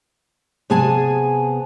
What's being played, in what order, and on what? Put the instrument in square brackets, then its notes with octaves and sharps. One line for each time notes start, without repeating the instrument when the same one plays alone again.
[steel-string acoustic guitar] C3 B3 G#4 G#5 A5